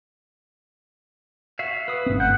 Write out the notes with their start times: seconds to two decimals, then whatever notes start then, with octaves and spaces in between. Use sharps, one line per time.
1.59 F#4 E5 F5
1.88 B4 D#6
2.06 G1 C4
2.20 A3 F#5 G6